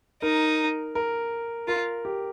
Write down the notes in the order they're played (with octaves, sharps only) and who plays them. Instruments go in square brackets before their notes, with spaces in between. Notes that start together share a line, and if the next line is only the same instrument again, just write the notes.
[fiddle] D#4 [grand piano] A#4
[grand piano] A#4
[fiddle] F4 [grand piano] A#4
[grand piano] G4